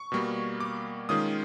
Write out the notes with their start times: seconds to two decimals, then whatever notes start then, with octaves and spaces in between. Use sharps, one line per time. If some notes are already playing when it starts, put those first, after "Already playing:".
Already playing: C#6
0.12 B2 G3 A#3
0.60 D6
1.09 D#3 G#3 C#4 F4 D#6